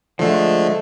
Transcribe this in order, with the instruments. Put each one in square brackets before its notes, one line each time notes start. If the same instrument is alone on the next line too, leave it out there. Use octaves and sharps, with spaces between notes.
[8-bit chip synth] D3 A3 [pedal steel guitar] F3 G#3